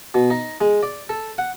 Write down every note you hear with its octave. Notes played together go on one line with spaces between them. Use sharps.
B2
D#4
G#3
D5
A4
F#5